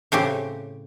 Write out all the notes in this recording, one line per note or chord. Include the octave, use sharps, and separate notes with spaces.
A2 C#3 C4 G4